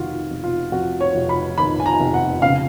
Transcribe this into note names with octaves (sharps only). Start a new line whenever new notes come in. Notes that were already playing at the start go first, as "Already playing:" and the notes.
Already playing: F1 D#3 F4 F#4
F1
F4
F2 F#4
C#5
F1
B5
D#3 B5
G#5
A#5
F1
F#5
C#3 F5